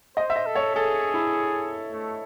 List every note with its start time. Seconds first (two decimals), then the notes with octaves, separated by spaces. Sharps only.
0.17 C5 D#5
0.30 E5
0.36 D#5
0.46 A4
0.55 C#5
0.75 G#4 A4
1.14 E4
1.92 A3